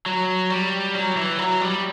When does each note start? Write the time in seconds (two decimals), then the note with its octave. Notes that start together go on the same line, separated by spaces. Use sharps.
0.06 F#3
0.50 G3
0.95 F#3
1.17 E3
1.39 F#3
1.61 G3